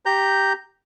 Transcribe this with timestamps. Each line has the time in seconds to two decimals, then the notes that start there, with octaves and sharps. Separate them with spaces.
0.06 G4 A#5 G6